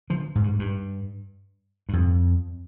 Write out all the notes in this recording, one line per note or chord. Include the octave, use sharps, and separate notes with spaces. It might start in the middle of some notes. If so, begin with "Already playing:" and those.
D3 F3
G#2
G2
G2
G2
F2